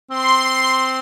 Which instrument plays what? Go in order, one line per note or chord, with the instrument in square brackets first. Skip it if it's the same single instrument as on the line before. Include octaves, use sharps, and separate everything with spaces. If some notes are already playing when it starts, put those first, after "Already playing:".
[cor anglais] C4 [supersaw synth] C6